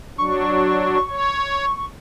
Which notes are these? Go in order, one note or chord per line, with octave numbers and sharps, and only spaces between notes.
F#3 D4 C#6
C#5